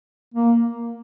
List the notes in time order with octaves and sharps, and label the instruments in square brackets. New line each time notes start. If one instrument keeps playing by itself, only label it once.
[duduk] A#3